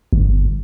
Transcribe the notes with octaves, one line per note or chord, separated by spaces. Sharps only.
G1